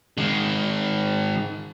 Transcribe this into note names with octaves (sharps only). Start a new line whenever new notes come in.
D#3 G#3